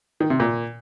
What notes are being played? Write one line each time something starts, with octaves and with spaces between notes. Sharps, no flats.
D#3
C3
A#2